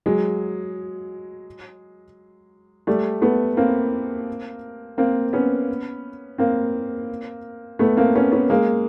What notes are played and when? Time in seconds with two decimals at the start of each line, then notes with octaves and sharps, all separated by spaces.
0.06 F#3 G#3
2.87 G3 A3
3.22 A3 B3
3.57 A#3 C4
4.98 A#3 C4
5.33 B3 C#4
6.38 A#3 C4
7.79 A3 B3
7.97 A#3 C4
8.15 B3 C#4
8.32 B3 C#4
8.50 G#3 A#3